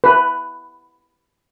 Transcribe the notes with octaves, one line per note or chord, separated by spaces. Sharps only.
B4